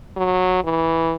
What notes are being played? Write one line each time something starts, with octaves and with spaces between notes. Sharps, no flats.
F#3
E3